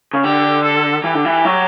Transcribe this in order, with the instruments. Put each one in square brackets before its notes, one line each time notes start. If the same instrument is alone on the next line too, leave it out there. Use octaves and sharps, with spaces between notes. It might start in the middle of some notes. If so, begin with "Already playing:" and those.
[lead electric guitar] C#3
[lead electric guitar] D3 [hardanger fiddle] G4
[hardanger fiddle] A4
[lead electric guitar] E3 [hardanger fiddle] G4
[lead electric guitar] D3
E3
F#3